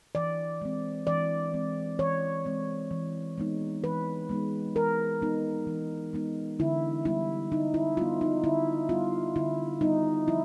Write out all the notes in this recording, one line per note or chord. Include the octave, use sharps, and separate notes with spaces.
E3 D5
G#3 C4
E3 D5
G#3 C4
E3 C#5
G#3 C4
E3
G#3 B3 D#4
E3 B4
G#3 B3 D#4
E3 A#4
G#3 B3 D#4
E3
G#3 B3 D#4
D3 E4
G3 B3 E4
D3 D#4
E4
G3 B3 F4
D#4
D3 E4
G3 B3 F4
D3 E4
G3 B3 D#4
F3 E4